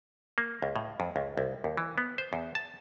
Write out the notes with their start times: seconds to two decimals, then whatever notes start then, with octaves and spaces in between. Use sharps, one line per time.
0.38 A#3
0.62 C#2
0.76 A2
1.00 F2
1.16 C#2
1.37 C2
1.64 D#2
1.77 E3
1.98 B3
2.18 C5
2.33 E2
2.55 A5